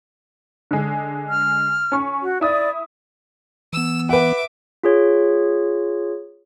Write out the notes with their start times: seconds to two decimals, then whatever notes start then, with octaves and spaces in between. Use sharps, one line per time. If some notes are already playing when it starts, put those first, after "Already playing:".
0.71 D3 G#3
1.29 F6
1.92 C#4 C#6
2.22 F#4
2.41 E4 D5 D#6
3.73 E3 B3 E6
4.09 B4 E5 F#5 D6
4.83 F4 G#4 C#5